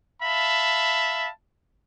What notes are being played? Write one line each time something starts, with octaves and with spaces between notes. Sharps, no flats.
E5 F5 A5 B5